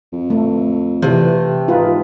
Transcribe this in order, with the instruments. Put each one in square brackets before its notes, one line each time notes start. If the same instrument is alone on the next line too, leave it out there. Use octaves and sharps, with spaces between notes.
[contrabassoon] F2
[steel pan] A3
[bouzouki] C3 A3 [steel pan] E3
[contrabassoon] G#2 [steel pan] D#4 F4 B4